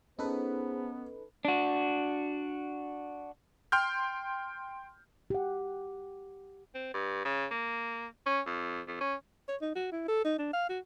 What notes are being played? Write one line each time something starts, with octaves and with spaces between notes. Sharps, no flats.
B3 C#4 D#4 G#4 A4 B4 C5
D4 F#4
G5 C6 F6 G6
G4 F#5
C4
G2
C#3
A#3
C#4
F2
F2
C#4
C#5
D#4
F#4
E4
A4
D#4
D4
F5
F#4